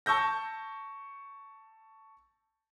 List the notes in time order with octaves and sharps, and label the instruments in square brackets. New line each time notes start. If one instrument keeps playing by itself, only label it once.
[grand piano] A5 C#6 E6 G6 A#6